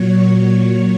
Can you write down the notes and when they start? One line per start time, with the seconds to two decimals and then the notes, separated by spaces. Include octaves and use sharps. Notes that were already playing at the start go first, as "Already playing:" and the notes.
Already playing: A#2 F#3 C#5
0.30 C#5